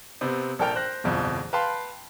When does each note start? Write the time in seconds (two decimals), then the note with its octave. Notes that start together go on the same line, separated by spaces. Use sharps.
0.21 C3 B3 C4
0.59 A#1 A4 A#4 G5 F6
0.75 C5 F#6 A#6
1.04 D1 G1 F2 B2
1.53 B4 F5 G5 A5 B5 C6